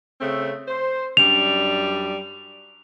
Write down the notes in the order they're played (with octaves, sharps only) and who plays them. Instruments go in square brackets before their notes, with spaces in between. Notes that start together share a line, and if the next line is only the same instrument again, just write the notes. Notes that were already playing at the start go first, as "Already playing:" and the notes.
[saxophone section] C#3 A3 C4
C5
[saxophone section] F#2 G3 D4 [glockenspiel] F7